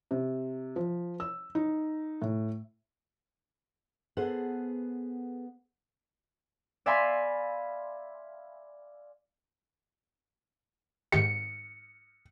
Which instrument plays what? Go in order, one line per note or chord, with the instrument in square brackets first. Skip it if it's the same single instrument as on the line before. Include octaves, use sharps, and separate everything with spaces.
[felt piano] C3
F3
E6
D#4
A2
[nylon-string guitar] B3 G#4 A4 C5 F#5
[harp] D5 E5 F5 G#5 B5 C6
[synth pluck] G#2 D#3 G4 [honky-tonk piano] C#7